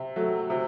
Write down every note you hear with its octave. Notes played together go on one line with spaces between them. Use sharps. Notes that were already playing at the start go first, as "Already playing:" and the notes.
Already playing: C3
F#3 A3
C3